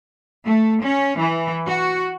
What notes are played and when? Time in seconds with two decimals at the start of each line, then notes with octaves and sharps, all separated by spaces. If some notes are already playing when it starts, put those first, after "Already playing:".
0.45 A3
0.82 C#4
1.19 E3
1.68 F#4